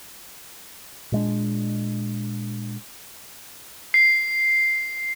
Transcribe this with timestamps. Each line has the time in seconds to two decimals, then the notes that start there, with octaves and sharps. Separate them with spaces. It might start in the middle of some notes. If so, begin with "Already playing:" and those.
1.12 A#2 G#3 D4
3.94 C7